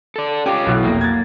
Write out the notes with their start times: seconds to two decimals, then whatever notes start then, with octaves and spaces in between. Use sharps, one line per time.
0.16 A4 D5
0.46 C#4 F4 G4 D6
0.66 B1 B2 E3
0.84 F1 A#3
1.01 G#6 A6